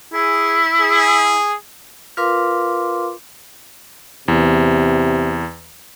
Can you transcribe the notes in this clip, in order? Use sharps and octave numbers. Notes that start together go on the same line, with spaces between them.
E4 G#4
G#4
F4 A#4 B4 F5 C6 D6
E2 C3